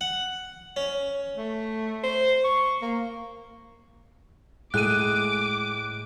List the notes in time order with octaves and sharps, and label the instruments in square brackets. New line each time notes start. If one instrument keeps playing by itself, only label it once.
[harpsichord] F#5
C#4
[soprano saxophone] A3
C5
C#6
A#3
[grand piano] A2 [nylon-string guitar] G#3 [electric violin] D6 [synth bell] F#6 D#7